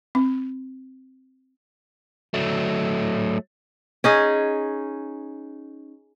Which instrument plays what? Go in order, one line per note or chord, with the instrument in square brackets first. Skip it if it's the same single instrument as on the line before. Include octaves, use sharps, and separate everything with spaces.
[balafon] C4
[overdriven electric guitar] F#3 A3
[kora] C#4 D#4 G#4